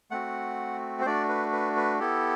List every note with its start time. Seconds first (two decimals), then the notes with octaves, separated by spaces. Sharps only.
0.11 A3 C4 F#4 F#5
1.01 C5
1.05 A3 D4 F#4 D5
1.29 B4
1.53 B4
1.76 B4
1.99 B3 E4 G4 A4